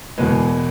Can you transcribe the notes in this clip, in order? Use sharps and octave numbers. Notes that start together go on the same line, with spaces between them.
E1 E2 B2 G#3 B4